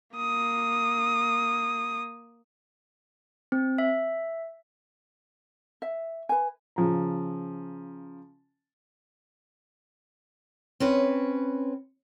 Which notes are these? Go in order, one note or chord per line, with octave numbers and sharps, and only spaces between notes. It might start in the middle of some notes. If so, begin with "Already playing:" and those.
A#3 D#6
C4
E5
E5
B4 G#5
C#3 F3 A#5
C4 C#4 B4